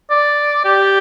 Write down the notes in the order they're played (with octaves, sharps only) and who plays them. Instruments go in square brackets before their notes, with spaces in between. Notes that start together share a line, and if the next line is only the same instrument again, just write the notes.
[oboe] D5
G4